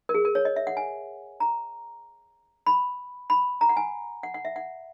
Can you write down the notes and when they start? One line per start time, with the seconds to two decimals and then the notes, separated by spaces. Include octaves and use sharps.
0.09 A#4
0.14 G#4
0.25 A#4
0.35 C#5
0.45 D#5
0.56 E5
0.67 F#5
0.77 G#5
1.40 A#5
2.66 B5
3.30 B5
3.61 A#5
3.69 F#5
3.77 G#5
4.23 F#5
4.34 F#5
4.45 E5
4.56 F#5